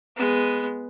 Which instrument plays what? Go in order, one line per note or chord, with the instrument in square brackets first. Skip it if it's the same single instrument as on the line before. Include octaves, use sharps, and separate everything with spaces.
[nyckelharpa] G#3 B3